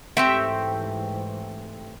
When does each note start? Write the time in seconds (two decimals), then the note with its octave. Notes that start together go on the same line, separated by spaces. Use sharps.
0.17 G#2 E3 A3 C4 G4 E5 G5